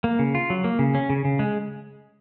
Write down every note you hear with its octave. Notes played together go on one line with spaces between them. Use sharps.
A#3
C#3
F4
F#3
A#3
C#3
C#4
C#3
C#3
G#3